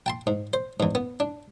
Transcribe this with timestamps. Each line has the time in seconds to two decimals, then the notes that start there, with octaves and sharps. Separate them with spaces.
0.06 G5 A5 C6
0.27 G#2
0.53 C5
0.80 E2 G#2
0.95 B3
1.20 D4